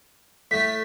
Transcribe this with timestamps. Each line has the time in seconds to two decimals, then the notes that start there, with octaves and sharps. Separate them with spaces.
0.51 A2 A3 B6